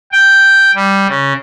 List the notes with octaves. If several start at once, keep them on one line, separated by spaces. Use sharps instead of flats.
G5
G3
C#3